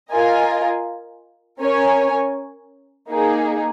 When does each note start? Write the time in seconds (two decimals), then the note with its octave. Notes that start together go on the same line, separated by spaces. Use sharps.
0.11 F4 A#4 D#5 G#5
1.59 C#4 A#4 C#5 G#5
3.08 A#3 D#4 G#4